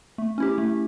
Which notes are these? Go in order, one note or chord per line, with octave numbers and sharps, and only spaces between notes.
A3
C#4 E4 G4
A3